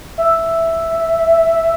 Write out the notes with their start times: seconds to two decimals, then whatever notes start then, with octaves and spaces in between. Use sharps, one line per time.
0.18 E5